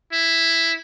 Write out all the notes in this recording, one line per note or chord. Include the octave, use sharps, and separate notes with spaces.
E4